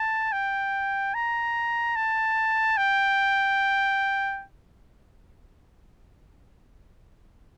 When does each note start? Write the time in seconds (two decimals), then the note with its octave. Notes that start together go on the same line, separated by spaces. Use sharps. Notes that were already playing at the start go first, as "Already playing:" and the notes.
Already playing: A5
0.32 G5
1.14 A#5
1.96 A5
2.77 G5